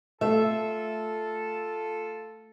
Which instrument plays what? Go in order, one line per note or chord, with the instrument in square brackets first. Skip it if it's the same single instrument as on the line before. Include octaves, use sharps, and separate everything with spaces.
[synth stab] A3 [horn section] F4 A4 [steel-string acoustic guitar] E5